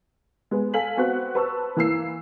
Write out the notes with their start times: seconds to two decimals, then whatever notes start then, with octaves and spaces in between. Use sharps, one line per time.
0.51 G#3 B3
0.74 A4 F5 G#5 B6 F#7
0.97 B3 C4 F#4 F#5 F#6
1.35 B4 C5 A5 C#6 E6
1.76 E3 A#3 E6 C7